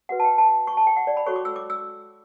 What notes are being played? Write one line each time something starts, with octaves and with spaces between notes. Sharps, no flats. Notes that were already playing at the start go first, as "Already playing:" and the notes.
F#4 B4 F#5
A5
G5
A5
C#6
A5
G5
F#5
D5
B5
F#4 A4 C#5 C#6
D6
E6
D6
E6